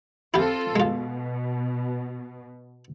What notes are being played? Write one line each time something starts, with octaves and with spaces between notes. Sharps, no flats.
C4 E4 F4 G4 A4
B2 G#3 F4